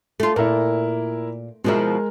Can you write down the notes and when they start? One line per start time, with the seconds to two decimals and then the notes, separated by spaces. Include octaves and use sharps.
0.20 A3 F4
0.36 A#2 E4 A#4
1.64 B2 F3 G#3 E4 A#4